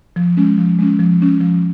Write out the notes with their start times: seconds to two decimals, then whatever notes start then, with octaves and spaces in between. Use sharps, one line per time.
0.16 F3
0.37 G#3 C#4
0.58 F3
0.79 G#3 C#4
0.99 F3
1.20 G#3 C#4
1.40 F3